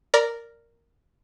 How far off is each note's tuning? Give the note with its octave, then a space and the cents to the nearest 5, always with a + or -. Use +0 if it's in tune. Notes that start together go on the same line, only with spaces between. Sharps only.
A#4 -5 D5 +0 A#5 +40